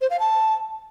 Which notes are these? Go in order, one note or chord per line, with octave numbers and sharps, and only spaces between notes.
C5
F5
A5